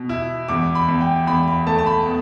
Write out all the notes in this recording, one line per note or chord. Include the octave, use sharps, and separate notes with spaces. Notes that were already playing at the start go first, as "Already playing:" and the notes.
Already playing: B2
E4
E2 D6
B5
E2
G5
E2 B5
B5
A3 A5
A5
B5
B3